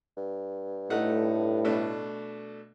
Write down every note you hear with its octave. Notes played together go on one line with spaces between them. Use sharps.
G2
A2 A3 D#4 F#5
B2 A3 D4